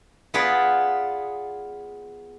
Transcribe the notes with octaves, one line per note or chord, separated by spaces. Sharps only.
B3 F4 G#4 B4 D5